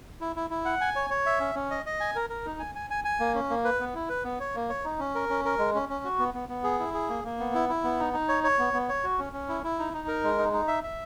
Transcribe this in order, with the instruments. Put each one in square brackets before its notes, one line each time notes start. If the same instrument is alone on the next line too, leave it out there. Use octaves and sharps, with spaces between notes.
[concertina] E4
E4
E4
F#5
G#5
C#5
C#5
E5
C#4
C#4
D#5
D#5
G#5
A#4
A#4
D#4
G#5
G#5
G#5
G#5
A#3
C#4
A#3
B4
B3
E4
B4
B3
C#5
A#3
C#5
D#4
C#4
A#4
C#4
A#4
G#3
C#4
C#4
F#4
B3
B3
B3
G#4
E4
G#4
A#3
A#3
B3
E4
E4
B3
D#4
D#4
C#5
C#5
B3
B3
C#5
F#4
C#4
C#4
E4
E4
D#4
D#4
A#4
G#3
D#4
D#4
E5
E5